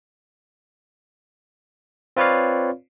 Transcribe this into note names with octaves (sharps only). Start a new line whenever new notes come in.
C4 F4 B4 C#5 D5 F5